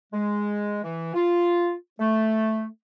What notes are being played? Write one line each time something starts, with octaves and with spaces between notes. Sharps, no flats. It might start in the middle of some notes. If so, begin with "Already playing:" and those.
G#3
E3
F4
A3